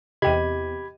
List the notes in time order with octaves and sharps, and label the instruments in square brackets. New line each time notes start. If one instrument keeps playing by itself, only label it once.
[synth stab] E2 C3 [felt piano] G4 D#7 [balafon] D#5 G5 [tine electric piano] B5 G#6